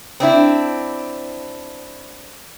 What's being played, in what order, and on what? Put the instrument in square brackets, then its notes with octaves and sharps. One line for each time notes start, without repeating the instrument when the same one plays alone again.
[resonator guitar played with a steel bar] C4 D4 E4